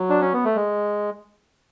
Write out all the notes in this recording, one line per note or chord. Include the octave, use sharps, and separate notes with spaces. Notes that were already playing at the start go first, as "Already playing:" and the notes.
Already playing: F#3
D4
C#4
B3
A3
G#3